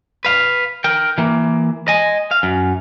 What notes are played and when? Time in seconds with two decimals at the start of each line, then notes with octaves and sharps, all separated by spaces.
0.25 B4 F5
0.84 A#4 G5
1.18 E3 A#3
1.88 D#5 G#5
2.31 F5
2.43 F#2